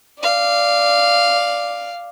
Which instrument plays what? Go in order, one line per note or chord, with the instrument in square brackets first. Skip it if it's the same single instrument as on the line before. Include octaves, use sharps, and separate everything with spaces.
[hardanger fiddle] D5 F5